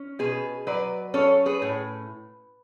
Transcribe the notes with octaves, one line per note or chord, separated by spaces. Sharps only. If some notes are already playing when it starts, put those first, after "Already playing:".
Already playing: C#4
B2 G#4 B4
F#3 B4 D5
C#4 A4 C#5
G#4 B4
A2